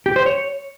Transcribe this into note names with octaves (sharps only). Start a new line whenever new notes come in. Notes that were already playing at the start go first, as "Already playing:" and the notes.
G4
C5
C#5